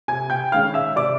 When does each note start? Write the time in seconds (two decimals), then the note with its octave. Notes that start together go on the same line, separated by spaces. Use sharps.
0.08 C3 G#5 G#6
0.30 G5 G6
0.52 D#3 G#3 C#4 F5 F6
0.74 E5 E6
0.96 C3 D5 D6